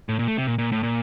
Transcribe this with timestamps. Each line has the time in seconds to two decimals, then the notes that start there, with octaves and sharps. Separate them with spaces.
0.09 A2
0.19 A#2
0.27 A3
0.37 C3
0.47 A#2
0.58 A#2
0.72 A2
0.83 A#2